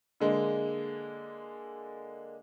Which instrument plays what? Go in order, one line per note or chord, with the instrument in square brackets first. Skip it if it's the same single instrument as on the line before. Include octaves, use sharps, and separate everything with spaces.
[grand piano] D3 G#3 A#3